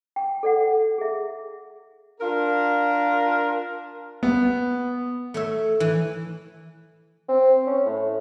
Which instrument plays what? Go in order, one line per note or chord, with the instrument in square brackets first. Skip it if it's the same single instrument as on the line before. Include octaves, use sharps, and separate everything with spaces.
[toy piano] G5
A4 D5 F#5
G#4 E5
[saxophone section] D4 F4 A#4
[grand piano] B3
[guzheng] A3 C#5 E5
E3
[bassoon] C4
C#4
A2